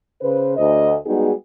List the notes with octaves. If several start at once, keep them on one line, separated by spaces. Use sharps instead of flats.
C#3 B4 C5
D2 C5 D#5
G3 G#3 B3 D#4 F#4 G#4